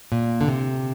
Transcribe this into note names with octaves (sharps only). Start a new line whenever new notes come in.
A#2
D3
C3